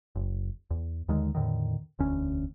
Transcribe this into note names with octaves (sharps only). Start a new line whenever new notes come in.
F#1
E2
D#2 D3 D#3 G#3
E2 A2 D3 D#3
E1 D2 C#4